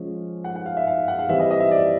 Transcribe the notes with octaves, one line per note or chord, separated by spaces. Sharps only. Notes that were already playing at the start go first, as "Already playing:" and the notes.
Already playing: F3 G#3 C#4
F#5
F#5
F5
E5
F5
F#5
F5
E3 G3 C4 E5
D#5
D#5
E5
D5